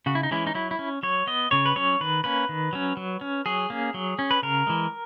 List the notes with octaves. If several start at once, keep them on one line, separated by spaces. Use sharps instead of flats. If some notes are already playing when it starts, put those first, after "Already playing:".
C#3 F#4
E4
D#4
E3 G#3 C#4 E4
D#4
F#3 E4
E4
C#4
F#3 C#5
B3 D#5
C#3 C#5
B4
F#3 C#4 C#5
D#3 B4
A#3 C#4 B4
D#3
F#3 C#4
F#3
C#4
F#3 G#4
A#3 C#4
F#3
C#4
B4
C#3 A#4
E3 G#3